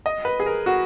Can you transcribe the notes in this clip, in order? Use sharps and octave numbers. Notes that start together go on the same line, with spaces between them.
D#5
B4
G#4
A#4
F#4